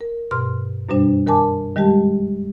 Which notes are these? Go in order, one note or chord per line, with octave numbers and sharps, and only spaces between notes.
A#4
G2 B2 C6 F6
F#2 B2 G3 D4 C5
D#3 A#4 G#5 A5 D6
D#3 G3 G#3 G4 A5